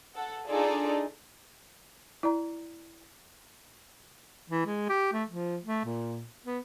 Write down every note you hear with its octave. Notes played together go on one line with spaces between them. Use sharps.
A4 F#5
D4 D#4 F4 G#4 A4 D5
E4 D5 A#5
E3
G#3
G4
A3
F3
A3
A#2
B3